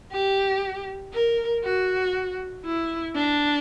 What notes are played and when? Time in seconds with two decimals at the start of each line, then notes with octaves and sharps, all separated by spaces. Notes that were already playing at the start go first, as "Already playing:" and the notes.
0.12 G4
1.13 A#4
1.64 F#4
2.65 E4
3.16 D4